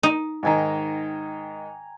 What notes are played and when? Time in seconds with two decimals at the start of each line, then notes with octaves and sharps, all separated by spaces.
0.03 D#4
0.43 G#2 D#3 G5 G#5 A#5